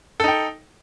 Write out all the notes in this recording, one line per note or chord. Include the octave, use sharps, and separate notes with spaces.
D#4 A4 G5